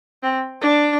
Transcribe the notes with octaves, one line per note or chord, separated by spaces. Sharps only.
C4
D4